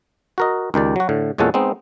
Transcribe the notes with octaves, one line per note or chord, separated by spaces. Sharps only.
F#4 A#4 D#5
C#2 D#3 G4 D5
F#3 F#4
A2 D3
E2 A#2 G#3 C#4 A4 F#5
G#3 B3 C4 D#4